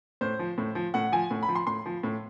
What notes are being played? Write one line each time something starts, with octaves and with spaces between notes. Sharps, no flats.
A2 C5
F3
A2
F3
A2 F#5
F3 G#5
A2
B5
F3
C6
A2 C6
F3
A2